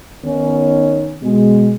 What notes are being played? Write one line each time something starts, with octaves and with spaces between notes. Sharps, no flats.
D#3 B3 C#4 D#4
B2 G#3